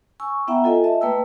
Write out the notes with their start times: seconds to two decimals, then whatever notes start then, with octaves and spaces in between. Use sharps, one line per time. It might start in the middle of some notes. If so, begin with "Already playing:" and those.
0.20 G#5 C#6 E6
0.47 B3 E4 E5 F#5 G5 A#5
0.64 F4 A4 D#5 G#5
0.84 D#5 E5 A5
1.01 A3 A#3 B4 G5 A5 E6